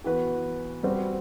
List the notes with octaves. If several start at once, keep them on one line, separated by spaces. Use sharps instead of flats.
E3 B3 F#4 B4
G3 C4 F#4 B4